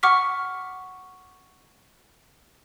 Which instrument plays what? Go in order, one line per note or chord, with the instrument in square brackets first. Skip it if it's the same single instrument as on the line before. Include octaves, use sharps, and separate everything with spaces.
[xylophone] F#5 C#6 D6 F6 B6